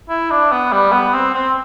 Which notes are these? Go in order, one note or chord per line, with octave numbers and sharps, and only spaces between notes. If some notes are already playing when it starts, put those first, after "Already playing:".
E4
D4
B3
G3
B3
C4
C4